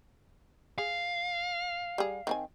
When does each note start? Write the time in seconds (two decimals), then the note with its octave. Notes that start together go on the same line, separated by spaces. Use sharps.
0.78 G#4 F5
1.98 G3 G#4
2.27 D#3 C4 G#5